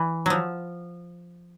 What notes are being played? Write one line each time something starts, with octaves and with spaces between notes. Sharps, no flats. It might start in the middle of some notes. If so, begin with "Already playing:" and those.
Already playing: E3
F3 F#3